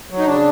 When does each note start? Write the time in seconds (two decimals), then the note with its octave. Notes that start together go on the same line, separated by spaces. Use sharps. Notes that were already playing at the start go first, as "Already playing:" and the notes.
0.11 F#3
0.19 D#4
0.27 C#3 D4